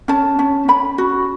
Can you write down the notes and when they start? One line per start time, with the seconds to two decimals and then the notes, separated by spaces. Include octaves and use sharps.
0.08 C#4 A5
0.39 C#4
0.68 C#4 B5
0.98 F#4